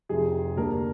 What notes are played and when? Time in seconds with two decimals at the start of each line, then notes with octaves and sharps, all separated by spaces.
0.09 F1 F2 C3 F3 G#4
0.56 D2 D3 G3 A#3 D4 A#4